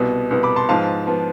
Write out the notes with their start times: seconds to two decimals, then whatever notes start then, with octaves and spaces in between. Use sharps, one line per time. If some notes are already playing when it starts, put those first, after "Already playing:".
Already playing: C2 B2 B3
0.31 C2 B2 B3
0.43 B5 D6
0.56 A5 C6
0.69 G#2 F3 B3 F5 A5
1.07 F3 B3